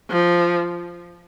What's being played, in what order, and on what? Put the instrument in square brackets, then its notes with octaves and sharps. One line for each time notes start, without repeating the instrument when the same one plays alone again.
[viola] F3